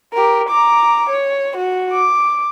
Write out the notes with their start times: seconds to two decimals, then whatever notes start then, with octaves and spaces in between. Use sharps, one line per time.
0.14 G4 A#4
0.49 A#5 D6
1.10 C#5
1.57 F#4
1.92 D6